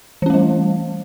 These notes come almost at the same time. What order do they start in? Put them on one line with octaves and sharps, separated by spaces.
E3 C#4 A3 G3